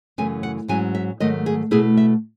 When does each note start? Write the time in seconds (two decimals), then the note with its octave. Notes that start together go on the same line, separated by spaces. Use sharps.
0.18 F#2 C#3 E3 A3 G#5
0.43 F#5
0.68 G#2 F#3 C#4 E4 G#5
0.95 E5
1.20 G#2 D#3 F#3 A3 D#5
1.46 G#4
1.71 B2 A3 E4 G#4
1.97 E5